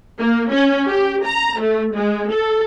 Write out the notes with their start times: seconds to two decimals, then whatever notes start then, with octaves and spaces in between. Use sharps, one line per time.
0.18 A#3
0.52 C#4
0.90 G4
1.26 A#5
1.60 A3
1.95 G#3
2.32 A4